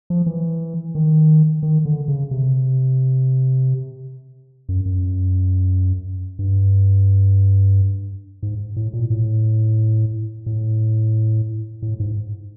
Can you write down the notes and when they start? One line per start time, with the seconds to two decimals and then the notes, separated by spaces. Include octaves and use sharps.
0.10 F3
0.26 E3
0.95 D#3
1.63 D#3
1.85 D3
2.08 C#3
2.31 C3
4.69 F#2
4.86 F#2
6.39 G2
8.43 G#2
8.76 A2
8.93 A#2
9.10 A2
10.46 A2
11.82 A2
12.00 G#2